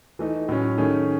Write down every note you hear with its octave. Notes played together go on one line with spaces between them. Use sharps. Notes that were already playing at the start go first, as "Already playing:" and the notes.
E3 A3 D#4
A2 F#3 C#4
D#3 A3 C#4 G#4